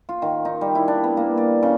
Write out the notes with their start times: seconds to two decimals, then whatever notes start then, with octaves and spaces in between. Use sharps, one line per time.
0.09 F4
0.22 D#3
0.45 D#4
0.61 G3
0.75 E4
0.88 D4
1.04 B3
1.17 A#3
1.37 D5
1.63 C#3